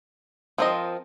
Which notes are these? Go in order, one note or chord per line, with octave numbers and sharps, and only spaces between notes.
F3 C4 F4 A#4 D#5